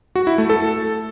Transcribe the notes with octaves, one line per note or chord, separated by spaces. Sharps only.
F#4
E4
A3
A4